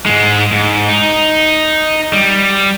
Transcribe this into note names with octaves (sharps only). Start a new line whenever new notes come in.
G#2 G#3
G#2
D#4
G3